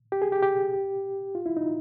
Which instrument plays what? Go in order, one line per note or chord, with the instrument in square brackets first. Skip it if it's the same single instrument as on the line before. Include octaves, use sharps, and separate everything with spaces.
[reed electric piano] G4
G#4
G4
G4
F4
E4
D#4